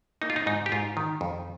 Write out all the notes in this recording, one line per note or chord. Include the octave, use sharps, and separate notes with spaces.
A#3 D#4
F4
D#4
G#2 D#4
G4
G#2 F4
D#3
F2